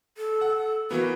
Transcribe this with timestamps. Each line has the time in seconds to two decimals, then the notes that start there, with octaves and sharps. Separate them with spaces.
0.18 A4
0.41 F#5
0.91 E3 A#3 B3 F#4